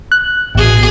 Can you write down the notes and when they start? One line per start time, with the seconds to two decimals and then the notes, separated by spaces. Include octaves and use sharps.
0.12 F#6
0.55 A1 B2 G#4